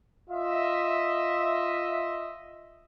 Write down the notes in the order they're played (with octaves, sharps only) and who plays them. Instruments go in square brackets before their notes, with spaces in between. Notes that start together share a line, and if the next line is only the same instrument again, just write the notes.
[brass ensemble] F4 D#5 E5